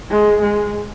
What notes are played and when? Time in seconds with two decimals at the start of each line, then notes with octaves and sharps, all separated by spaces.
0.11 G#3
0.42 G#3